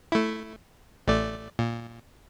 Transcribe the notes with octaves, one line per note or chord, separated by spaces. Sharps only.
A3 E4
A1 A3 D5
A#2